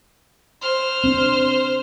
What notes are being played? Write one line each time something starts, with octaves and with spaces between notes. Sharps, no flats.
C5 F6
C4 D4